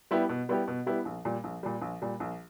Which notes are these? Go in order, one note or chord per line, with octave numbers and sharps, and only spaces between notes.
G3 B3 E4 G4
B2
G3 B3 E4 G4
B2
G3 B3 E4 G4
A#1
A#2 G3
A#1
A#2 G3
A#1
A#2 G3
A#1